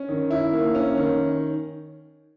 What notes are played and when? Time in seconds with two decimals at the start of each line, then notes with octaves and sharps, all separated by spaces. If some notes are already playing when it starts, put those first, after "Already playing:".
Already playing: C#4
0.09 D#3
0.30 E4
0.53 A#3
0.75 C#4
0.96 D#3